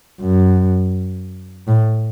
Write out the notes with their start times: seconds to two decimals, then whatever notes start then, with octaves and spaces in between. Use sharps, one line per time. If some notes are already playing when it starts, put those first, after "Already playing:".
0.21 F#2
1.68 A2